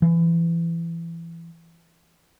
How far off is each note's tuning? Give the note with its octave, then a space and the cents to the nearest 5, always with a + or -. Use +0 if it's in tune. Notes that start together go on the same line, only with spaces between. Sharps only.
E3 +25